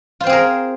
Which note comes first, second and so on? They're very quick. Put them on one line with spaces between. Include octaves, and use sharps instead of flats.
F4 C5 C4 G#4 A#4